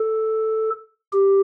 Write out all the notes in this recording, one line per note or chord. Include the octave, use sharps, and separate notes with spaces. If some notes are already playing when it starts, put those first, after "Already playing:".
Already playing: A4
G4